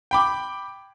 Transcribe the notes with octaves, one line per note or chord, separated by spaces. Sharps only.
G5 B5 D6